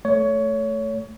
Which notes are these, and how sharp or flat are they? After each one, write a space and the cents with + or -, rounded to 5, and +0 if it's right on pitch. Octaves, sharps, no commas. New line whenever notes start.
A3 +0 C#5 +20